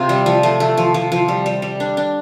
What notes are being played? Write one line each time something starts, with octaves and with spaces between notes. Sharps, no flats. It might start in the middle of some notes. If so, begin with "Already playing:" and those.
Already playing: C3 F4
G3
F3
A3
A3
F3
F3
F3
G3
G3
G3
D4
D4